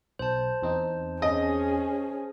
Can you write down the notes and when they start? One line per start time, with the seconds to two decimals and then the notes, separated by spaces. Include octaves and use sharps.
0.19 B1 C5 A5
0.62 E2 C4 D#4
1.22 C#4 G#4 D#5